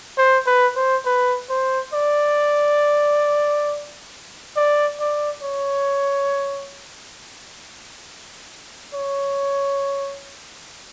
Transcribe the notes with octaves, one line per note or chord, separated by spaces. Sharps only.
C5
B4
C5
B4
C5
D5
D5
D5
C#5
C#5